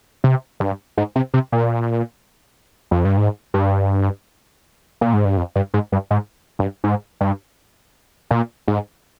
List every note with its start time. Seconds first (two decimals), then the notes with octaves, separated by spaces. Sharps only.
0.24 C3
0.60 G2
0.97 G#2
1.16 C3
1.34 C3
1.52 A#2
2.91 F2
3.05 G2
3.17 G#2
3.54 G2
5.01 A#2
5.13 G#2
5.25 G2
5.37 F2
5.56 G2
5.74 G#2
5.92 G2
6.11 G#2
6.59 G2
6.84 G#2
7.21 G2
8.31 A#2
8.68 G#2